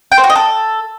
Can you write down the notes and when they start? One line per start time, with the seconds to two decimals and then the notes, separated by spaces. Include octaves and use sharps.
0.12 G5
0.18 C5
0.24 F#4
0.30 D#5
0.36 A4